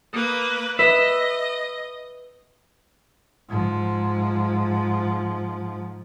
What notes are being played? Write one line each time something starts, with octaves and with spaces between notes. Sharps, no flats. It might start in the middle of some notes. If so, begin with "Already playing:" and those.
A#3 B4 D#6
B4 D#5 E5
G#2 F3